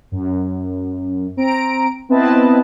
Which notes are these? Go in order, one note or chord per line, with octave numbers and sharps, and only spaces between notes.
F#2
C4 A#5 D7
B3 C4 E4 B4 D#5 A5